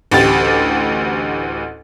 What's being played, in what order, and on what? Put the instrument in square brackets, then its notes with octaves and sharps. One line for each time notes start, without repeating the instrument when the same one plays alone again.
[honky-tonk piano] A1 D2 G4 A6